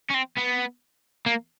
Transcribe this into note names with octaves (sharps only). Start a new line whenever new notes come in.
C#4
C4
B3
A#3